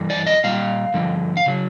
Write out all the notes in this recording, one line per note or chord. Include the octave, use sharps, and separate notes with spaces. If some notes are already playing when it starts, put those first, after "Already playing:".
Already playing: G2 E3
D5
D#5
A#2 G3 F5
G2 D3 F3
F5
C#3 F#3